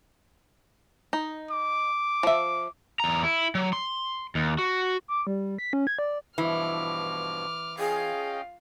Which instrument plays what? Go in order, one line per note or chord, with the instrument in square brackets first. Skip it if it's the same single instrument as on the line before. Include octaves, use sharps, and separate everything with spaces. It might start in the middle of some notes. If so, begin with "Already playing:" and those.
[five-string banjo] D#4
[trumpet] D6
[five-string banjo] F3 E5
[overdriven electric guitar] E2 A#5
E4
F#3
C6
D#2
F#4
[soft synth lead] D6
G3
B6
C#4
G#6
D5
[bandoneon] G2 B2 F3 [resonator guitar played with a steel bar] E3 [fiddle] D6 F6
[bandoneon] C#4 D#5 G5 [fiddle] F4 F5 [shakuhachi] G#4